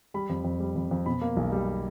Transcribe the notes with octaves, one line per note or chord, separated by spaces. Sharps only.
G3 B5
F2
F2
G3
F2
F2
B2 B5
A#3
B1
G3